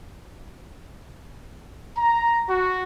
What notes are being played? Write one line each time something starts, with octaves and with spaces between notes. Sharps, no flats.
A#5
F#4